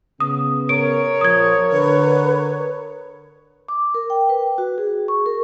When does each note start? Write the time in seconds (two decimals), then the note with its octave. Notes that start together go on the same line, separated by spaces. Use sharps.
0.20 C#3 B3 D#6
0.69 A#4 C#5 D7
1.21 A#1 F3 D#6 G#6
1.72 D3 B4
3.68 D6
3.95 A#4
4.10 G5
4.29 B4
4.58 F#4
4.78 G#4
5.08 C#6
5.26 A#4